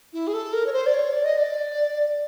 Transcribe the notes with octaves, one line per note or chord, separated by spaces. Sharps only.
E4
G#4
A4
A#4
C#5
C5
D5
C#5
D5
D#5
D5